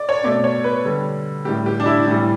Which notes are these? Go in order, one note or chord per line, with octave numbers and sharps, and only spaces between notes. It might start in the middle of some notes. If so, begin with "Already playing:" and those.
Already playing: D5
C#5
B2 A3 D5
C#5
B4
D3 G3
A2 G3 G4
G4
D4
E4
A2 E3 G3